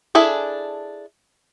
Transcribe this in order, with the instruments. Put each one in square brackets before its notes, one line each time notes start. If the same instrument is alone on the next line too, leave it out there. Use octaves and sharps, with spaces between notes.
[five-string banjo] D4 E4 G#4 A4